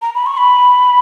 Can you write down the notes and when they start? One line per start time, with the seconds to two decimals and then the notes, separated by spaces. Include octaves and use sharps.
0.02 A#5
0.15 B5
0.26 C#6
0.37 B5